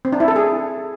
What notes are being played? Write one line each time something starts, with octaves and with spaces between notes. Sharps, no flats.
C4
D4
E4
A4
G#4